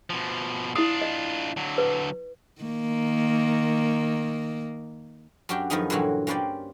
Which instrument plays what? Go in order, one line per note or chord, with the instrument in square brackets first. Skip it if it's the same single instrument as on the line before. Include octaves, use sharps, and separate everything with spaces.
[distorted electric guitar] B2 F3
[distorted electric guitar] D4 F4 [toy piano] E4 D#6
[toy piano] D#5
[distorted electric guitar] D3 F#3
[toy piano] B4
[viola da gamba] D#3 A#3
[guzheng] F#2 D4 F#4 G4 G5
F#2 D#3 F3 B3 D#4 G#4
G2 A#2 D3 E3 F#3 F#4
A#3 C#4 B4 C5 D5 G5